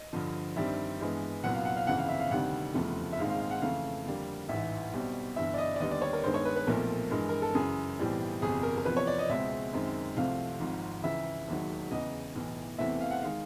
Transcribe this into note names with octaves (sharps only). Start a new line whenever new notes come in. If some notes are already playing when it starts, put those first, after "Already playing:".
Already playing: D#5
G2 D3 F3
G2 D#3 G3 C4 E5
G2 E3 G#3 B3
C2 A#2 F#3 B3 F#5
F5
F#5
F5
G1 F2 C#3 E3 F#5
F5
E5
F5
D2 C3 D#3 G3 F#5
F1 E2 C#3 F3 A3
E5
A#1 G#2 D#3 G#3 C4 F5
F5
F5
F#5
F2 C#3 E3 A3 F5
F2 D3 G3 A#3
A1 G#2 E3 E5
B1 B2 G3 C4
G1 G2 E3 E5
D5
D#5
D5
D#2 D3 G3 B3 D#5
D5
C#5
A#4
G2 D#3 G#3 B3 C5
C#5
B4
B4
B1 A#2 F3 A3 C4 A#4
G2 E3 G#3
A#4
A4
F#2 C#3 E3 G#4
B1 A2 E3 G3 C4
G1 F2 C3 G#4
A#4
A#4
E2 C3 F3 B4
C#5
D5
D#5
C#2 B2 G#3 C4 E5
F#2 D#3 G#3 C4
C2 C3 F3 A3 C4 F5
G#1 G#2 F3
C#2 C#3 E3 E5
E1 D#2 D#3 F#3
E2 C#3 E3 D#5
B1 A2 E3
E2 C3 E3 A3 C4 E5
F5
F#5
D#3 G#3 F5